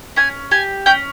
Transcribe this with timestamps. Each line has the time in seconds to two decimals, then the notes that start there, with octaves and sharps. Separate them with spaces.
0.16 C#4 G#5
0.51 G4 G#5
0.86 C#4 G5